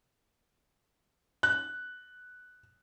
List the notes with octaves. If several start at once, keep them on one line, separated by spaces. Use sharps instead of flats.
F#6